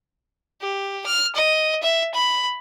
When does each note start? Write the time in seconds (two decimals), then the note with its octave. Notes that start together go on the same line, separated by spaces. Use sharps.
0.62 G4
1.06 F6
1.35 D#5
1.83 E5
2.15 B5